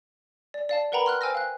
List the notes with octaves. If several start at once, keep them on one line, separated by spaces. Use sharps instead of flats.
D5
D5 F5 A5
A#4 B4 F#5 G5 A#5 B5
C6 F6 F#6
C5 G5 G#5 E6 F6 A#6
F5 F#6